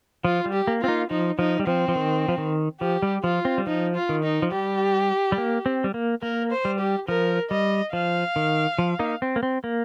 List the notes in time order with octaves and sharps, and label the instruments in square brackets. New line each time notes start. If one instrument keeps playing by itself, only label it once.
[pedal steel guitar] F3 [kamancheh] F4
[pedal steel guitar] G3
[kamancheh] G4
[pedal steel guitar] A#3
[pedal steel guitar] C4 [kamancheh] F4
[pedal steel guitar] A#3 D#4
[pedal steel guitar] F3 [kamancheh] D#4
[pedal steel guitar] F3 [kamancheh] D#4
[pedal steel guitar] G3
[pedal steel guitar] F3 [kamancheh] C4
[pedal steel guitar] F3
D#3
F3
D#3
[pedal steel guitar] F3 [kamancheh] G4
[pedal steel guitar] G3
[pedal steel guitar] F3 [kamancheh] F4
[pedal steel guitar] C4
G3
[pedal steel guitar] F3 [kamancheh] D#4
[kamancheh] F4
[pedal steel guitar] D#3
[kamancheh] D#4
[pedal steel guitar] F3
[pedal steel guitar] G3 [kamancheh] G4
[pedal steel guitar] G3
A#3
C4
G3
A#3
[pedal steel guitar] A#3 [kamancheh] A#4
[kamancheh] C5
[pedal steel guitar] G3
[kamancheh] G4
[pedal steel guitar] F3 [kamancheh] A#4
[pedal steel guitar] G3 [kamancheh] D#5
[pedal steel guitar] F3 [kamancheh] F5
[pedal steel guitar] D#3
F3
A#3 D#4
C4
A#3
C4
A#3